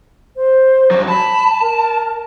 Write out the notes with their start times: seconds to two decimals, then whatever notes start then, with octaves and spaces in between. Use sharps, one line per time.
0.36 C5
0.91 G2 F#3
1.08 A5 B5
1.61 A#4